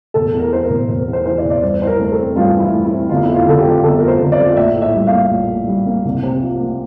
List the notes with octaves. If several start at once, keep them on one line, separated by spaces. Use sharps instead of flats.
E1 A4
E2
A#4
E3 C5
A#4
E1
E1 C5
E2
C5
E3 C5
D5
E1
D5
G2 C5
E3 C5
A#4
A3
A#4
A4
C4
G2 F4
E3
E4
A3
E4
C4
G1 F4
E4
F2
F4
D3 A4
G4
F3
G1 A4
F2 A#4
C5
D3
D5
F3
A#1 E5
A2
E5
G3
F5
A#3
A#1
A2
G3
A#3
C2
C3
F3
A#3